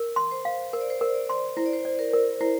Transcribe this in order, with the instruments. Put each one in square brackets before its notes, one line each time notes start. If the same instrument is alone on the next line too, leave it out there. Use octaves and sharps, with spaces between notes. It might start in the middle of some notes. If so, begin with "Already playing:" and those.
Already playing: [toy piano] A#4
C6
[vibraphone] C5
[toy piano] F5
[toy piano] A#4 [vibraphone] C5
[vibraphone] D5
C5
[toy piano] A#4
[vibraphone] D5
[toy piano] C6
[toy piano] E4 [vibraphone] C5
[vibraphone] D5
C5
[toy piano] D5
[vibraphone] A#4
[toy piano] A#4
[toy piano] E4 [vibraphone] C5